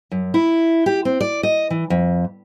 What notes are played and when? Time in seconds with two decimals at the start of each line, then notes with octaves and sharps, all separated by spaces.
0.12 F#2
0.34 E4
0.86 G4
1.05 C4
1.21 D5
1.43 D#5
1.70 E3
1.90 F2